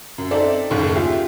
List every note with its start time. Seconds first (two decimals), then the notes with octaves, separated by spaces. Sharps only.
0.18 F#2
0.31 C4 D#4 A4 D5 E5
0.70 F#1 D#2 A2
0.96 F4 G4 G#4 E5